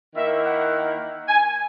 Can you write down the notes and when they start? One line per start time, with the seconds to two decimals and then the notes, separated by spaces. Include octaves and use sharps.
0.16 D#3 A#3 E4 E5
0.44 F#5
1.29 G#5